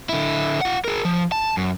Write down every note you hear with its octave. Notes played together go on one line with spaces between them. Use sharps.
D3 E4
F4 F#5
G#4 A#4
F3
A5
F#2